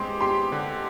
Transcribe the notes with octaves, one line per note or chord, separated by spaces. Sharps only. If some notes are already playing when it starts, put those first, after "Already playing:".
Already playing: G#3 C4 G4 C6
G4 C6
D3